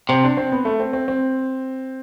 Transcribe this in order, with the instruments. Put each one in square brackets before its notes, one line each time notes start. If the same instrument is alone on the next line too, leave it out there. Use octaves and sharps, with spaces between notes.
[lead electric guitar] C3 [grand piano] C4
[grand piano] D4
C4
B3
A3
C4
C4
C4